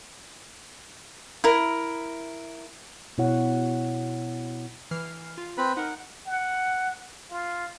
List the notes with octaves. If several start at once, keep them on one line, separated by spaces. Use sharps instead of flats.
E4 A#4
B2 E4 C#5 F#5
E3 F6 C7
F4
C4 B4 B5
D#4 A#4 F#5
F#5
F4